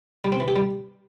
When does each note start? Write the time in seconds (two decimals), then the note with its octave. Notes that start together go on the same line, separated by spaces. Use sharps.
0.25 G3
0.32 C4
0.40 E3
0.48 G4
0.56 G3